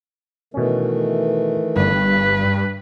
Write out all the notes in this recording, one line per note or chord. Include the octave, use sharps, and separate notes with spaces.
B2 D#3 E3 A3 C#4
G1 G2 B4